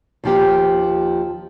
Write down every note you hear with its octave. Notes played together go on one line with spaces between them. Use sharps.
D#2 F3 G4